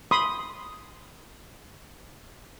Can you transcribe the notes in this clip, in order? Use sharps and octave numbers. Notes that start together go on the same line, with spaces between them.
B5 C6 D#6